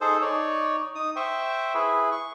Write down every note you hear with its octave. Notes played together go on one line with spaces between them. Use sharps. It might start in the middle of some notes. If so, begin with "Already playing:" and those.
D#4 G#4 A4 C5
D#4 C#5 D5
D#4 D#6
C5 E5 G5 C#6
E4 G#4 B4
C#6